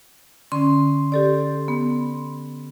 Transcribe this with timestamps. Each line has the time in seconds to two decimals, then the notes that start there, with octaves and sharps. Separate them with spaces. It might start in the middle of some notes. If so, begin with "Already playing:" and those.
0.52 D3 C#4 C6
1.12 G4 A4 D5
1.68 B3